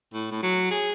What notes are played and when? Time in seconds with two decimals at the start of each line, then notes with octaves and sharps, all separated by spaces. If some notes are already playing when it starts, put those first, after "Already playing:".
0.14 A2
0.31 A2
0.43 F#3
0.70 G#4